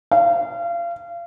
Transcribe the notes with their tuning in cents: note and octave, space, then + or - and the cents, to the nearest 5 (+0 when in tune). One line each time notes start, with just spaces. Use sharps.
F5 -30